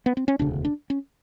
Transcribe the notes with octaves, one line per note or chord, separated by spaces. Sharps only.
B3
C4
C#4
E1 D2 C#3 D4
D4
C#4